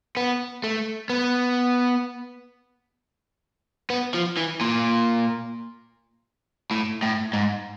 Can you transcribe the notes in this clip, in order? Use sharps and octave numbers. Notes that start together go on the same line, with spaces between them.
B3
A3
B3
B3
F3
E3
A#2
A2
A2
G#2